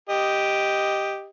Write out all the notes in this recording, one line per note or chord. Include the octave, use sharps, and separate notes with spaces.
G4 D#5